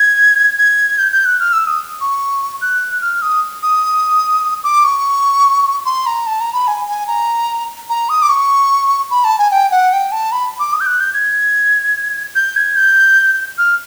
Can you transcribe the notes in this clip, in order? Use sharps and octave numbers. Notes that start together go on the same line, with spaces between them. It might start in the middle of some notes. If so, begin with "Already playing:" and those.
Already playing: G#6
G#6
G6
G6
F#6
F6
E6
D#6
C#6
F#6
F6
D#6
D#6
D6
C#6
C6
A#5
A5
A#5
B5
G#5
G#5
A#5
A#5
D#6
D6
C#6
B5
A5
G#5
G5
F#5
G5
A5
B5
D6
D#6
G6
F#6
G6
G#6
G6
G#6
G6
F6